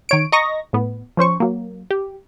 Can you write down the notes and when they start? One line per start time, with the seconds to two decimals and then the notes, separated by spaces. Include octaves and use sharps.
0.09 D#3 C#5 D7
0.32 D#5 A#5 C#6 A#6
0.73 A2 B3
1.17 F3 C#4 C5 C#6
1.40 F#3 A#3
1.90 G4